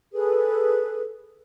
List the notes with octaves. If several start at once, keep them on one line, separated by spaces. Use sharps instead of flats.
G#4 A4 B4